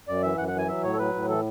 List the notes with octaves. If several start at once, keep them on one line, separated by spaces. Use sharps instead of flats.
F#2 D5
E3 E5
F#2 F#5
F#5
E3
G#5
F#3 E5
A2 C#5
A4
F#3 B4
A2
E3 A4